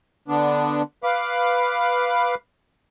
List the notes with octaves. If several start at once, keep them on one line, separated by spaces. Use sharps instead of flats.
D3 B3 D4
B4 F5 B5 D6